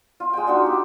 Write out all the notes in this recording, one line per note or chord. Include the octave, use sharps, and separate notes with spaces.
F4
G#3 G5
D4 D#4 F#4 E6
G4